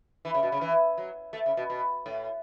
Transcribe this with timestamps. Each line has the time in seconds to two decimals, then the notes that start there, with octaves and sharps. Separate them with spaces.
0.25 E3
0.34 C#3
0.43 B2
0.52 C#3
0.61 E3
0.98 F#3
1.33 A3
1.46 C#3
1.57 B2
1.70 B2
2.06 A2